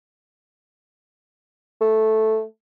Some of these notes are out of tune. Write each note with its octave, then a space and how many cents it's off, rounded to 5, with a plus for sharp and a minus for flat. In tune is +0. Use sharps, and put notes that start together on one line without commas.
A3 -5